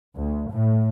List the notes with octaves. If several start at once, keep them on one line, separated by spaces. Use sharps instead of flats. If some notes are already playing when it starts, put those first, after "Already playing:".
D2
A2